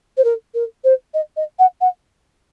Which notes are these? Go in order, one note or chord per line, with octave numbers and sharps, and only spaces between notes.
C5
A#4
A#4
C5
D#5
D#5
F#5
F#5